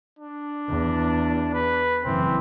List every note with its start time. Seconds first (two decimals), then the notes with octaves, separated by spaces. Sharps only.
0.19 D4
0.68 E2
1.53 B4
2.05 F#1 E3 C4